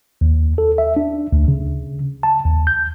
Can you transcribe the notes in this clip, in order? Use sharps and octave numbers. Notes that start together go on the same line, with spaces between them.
D#2
A4
E5
D4
D2
C#3
A5
D#2
G6